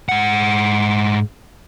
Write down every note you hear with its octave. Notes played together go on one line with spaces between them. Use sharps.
G#2 F#5